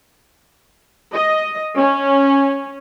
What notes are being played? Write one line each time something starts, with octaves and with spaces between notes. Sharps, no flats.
D#5
C#4